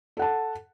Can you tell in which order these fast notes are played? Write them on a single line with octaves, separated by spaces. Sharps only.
A4 F#5 A5